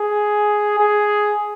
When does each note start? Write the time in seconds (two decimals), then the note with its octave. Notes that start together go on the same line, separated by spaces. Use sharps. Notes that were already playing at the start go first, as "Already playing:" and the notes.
Already playing: G#4
0.79 G#4